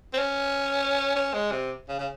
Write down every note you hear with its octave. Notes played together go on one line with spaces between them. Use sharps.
C4
C#4
C#4
G#3
C3
C#3
C#3